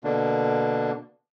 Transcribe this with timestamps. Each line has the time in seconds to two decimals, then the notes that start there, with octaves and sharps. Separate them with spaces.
0.04 B2 D3 A#3 D4